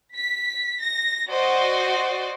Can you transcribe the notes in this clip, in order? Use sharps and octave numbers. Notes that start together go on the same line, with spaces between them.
B6
A#6
F#4 C5 D5 D#5